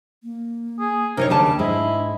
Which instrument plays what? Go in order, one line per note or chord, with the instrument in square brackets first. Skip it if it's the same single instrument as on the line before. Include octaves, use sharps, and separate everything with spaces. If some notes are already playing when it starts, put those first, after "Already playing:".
[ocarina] A#3
[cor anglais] G#4
[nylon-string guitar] C3 D#4 C#5 [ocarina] D4 [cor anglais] A#4
[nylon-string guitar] D#2 C#3 A5 [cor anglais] G3
[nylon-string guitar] G#2 G#3 [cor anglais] E4